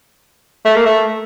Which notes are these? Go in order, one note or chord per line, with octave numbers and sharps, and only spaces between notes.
A3
A#3
A3